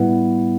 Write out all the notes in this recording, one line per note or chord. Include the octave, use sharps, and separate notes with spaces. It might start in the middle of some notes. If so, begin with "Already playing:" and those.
Already playing: A2 G3 B3 E4